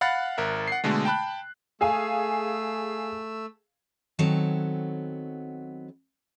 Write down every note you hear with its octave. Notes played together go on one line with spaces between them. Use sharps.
F5 F#5 B5 F#6 A6
G#1 A#4 E5
F#5 C7
B2 D3 G#3 A3
G5 A5 B5 F#6
A3 G#4 F5 G#5 E6
D#3 F#3 B3 C4 A4 C#5